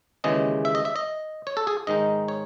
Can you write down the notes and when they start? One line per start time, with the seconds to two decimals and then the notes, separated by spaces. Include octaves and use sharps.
0.24 D#2 C#3 E3 G#3 D#5
0.65 E5
0.75 D#5
0.85 E5
0.96 D#5
1.47 C#5
1.57 A4
1.67 G#4
1.87 G#2 D#3 G#3 D#4 D#5
2.28 C#5